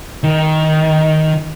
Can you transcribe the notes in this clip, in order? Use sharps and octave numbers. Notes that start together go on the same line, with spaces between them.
D#3